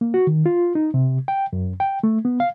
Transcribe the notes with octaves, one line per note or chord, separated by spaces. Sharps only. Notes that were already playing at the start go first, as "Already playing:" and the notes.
A#3
F#4
D#3
F4
D#4
C3
G5
F#2
G5
A3
B3
F5